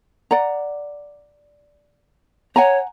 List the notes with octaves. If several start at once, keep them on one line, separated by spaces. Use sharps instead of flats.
D5 F#5 A#5
C#5 F#5 G#5 A#5